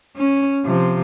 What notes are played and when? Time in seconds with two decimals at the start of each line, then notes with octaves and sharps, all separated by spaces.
0.16 C#4
0.65 C3 F3